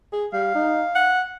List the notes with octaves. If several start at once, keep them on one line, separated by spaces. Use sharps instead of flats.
G#4
G3 F5
D#4
F#5